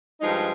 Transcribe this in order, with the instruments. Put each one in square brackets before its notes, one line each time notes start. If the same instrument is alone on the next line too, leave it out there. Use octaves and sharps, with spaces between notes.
[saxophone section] G2 F3 G#3 D#4